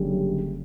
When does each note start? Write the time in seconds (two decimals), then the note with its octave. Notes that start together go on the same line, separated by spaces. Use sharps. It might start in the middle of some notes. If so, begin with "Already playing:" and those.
Already playing: F#1 F#2 D3 G3